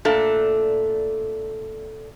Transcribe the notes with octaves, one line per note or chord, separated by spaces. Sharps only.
A#2 A3 D4 A4